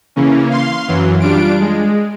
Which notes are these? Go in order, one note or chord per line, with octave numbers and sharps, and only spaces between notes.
C#3 E3 A#3 C#4
F5 C6
F#2 E3 F#3
G3 D4 F4 D7
G#3